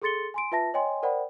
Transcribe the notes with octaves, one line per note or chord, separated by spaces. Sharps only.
G#4 A4 C6 A6 C#7 G7
G#5 C6 D7
F4 B4 E5 A5 A#6
C#5 D#5 G5 G#5 C6
A#4 C5 D5 F#5 G5 B5